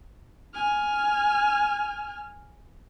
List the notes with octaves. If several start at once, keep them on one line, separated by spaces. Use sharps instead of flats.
G#5 F6